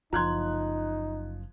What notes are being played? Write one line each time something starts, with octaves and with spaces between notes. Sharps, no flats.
F#1 F#2 F3 D#4 A#5 C6 F#6 G#6